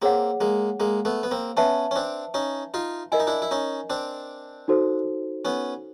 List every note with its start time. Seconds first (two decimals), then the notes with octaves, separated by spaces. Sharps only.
0.02 A#3 C4 G#4 C#5 F#5
0.41 G#3 A#3
0.80 G#3 A#3
1.05 A3 B3
1.23 B3
1.31 A#3 C4
1.57 B3 C#4 B4 E5 A5
1.91 C#4
1.96 C4 D4
2.34 C#4 D#4
2.74 D#4 F4
3.12 E4 A#4 D#5 G#5
3.20 D#4
3.27 D4 E4
3.42 E4
3.51 C#4 D#4
3.90 C4 D4
4.68 D#4 F#4 A4 C5
5.45 B3 C#4